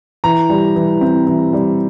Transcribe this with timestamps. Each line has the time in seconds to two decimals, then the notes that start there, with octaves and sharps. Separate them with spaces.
0.24 E3 A#5
0.50 G3
0.76 E3
1.01 C4
1.27 E3
1.53 G3